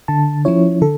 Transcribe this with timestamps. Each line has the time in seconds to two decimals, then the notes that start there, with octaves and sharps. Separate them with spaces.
0.08 D3 A5
0.45 F3 C#4 E4 C#5
0.82 D3 A4